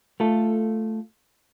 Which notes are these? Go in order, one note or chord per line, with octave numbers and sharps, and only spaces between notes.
A3 F4 A4